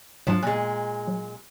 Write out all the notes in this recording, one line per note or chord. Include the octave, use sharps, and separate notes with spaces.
G#2 F3 F#3 D4
A#2 G#3 F#6 A6
F#3